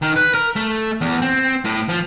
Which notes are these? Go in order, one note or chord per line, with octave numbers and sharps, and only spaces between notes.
D#3
B4
A#4
A3
E2
C4
A2
F3